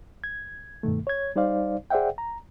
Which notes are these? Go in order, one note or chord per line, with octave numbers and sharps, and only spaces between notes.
G#6
G2 B2 D#3 A3
C#5 G#6
G3 D#4 C5 D5 F5
G#4 C5 D5 E5 F#5 G5
A#5